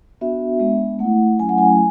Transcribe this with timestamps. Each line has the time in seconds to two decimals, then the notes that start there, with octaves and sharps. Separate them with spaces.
0.21 B3 D4 F#4 E5
0.60 G#3 B3 D4
0.99 A3 E4 F#5
1.39 F#3 A3 C#4 E4 G#5
1.49 F#5
1.58 G#5